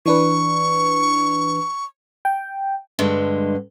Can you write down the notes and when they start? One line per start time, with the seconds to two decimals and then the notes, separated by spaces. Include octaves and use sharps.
0.06 E3 D4 B4 C#6
2.25 G5
2.99 G2 D3 G#3